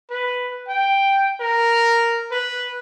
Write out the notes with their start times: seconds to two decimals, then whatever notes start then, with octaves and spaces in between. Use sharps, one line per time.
0.10 B4
0.68 G5
1.40 A#4
2.31 B4